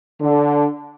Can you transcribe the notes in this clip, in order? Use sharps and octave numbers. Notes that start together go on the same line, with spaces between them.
D3